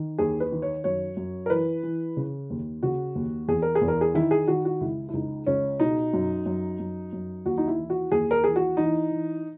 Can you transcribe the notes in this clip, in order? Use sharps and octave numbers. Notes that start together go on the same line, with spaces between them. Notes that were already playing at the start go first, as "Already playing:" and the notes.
Already playing: D#3
D#2 G#4
B4
D#3
C#5
F#2 C#5
F#2
A#4
E3 B4
E3
C#3
D#2
C#3 F#4
D#2
E2 G#4
A#4
G#4
E2
A#4
G#4
D#3 E4
G#4
D#3 F#4
F#4
C#2 E4
E4
C#2 D#4
C#2 C#4
B2 D#4
F#2
F#2
F#2
F#2
D#2 F#4
D#4
E4
E3
F#4
D#2 G#4
A#4
E3 G#4
F#4
E3 D#4
E3